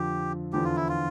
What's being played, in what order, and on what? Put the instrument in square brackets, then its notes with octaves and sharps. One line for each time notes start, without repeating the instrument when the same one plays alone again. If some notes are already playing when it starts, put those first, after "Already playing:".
Already playing: [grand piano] F2 D3 F3 [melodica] G4
[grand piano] E2 D3 F3 [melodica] G4
[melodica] F4
E4
F4